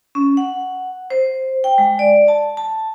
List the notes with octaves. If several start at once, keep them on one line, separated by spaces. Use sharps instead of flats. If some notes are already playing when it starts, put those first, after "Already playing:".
C#4
F#5
C5
G5
G#3
D5
A5
A5